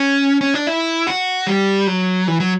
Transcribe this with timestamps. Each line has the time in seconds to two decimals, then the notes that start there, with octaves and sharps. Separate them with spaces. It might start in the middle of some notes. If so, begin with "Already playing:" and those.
Already playing: C#4
0.41 C#4
0.54 D4
0.67 E4
1.07 F#4
1.47 G3
1.87 F#3
2.28 E3
2.40 F#3